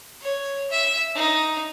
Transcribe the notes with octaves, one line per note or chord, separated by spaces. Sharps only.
C#5
E5
D#4